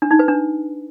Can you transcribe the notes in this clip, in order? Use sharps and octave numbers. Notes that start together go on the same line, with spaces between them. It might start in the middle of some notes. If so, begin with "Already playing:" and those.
D4
D#4
B4
D4